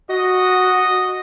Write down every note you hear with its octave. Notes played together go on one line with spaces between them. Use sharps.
F#4 D#5